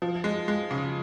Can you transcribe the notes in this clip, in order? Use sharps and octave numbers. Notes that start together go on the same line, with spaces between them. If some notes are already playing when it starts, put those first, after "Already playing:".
F3
G#3
G#3
C#3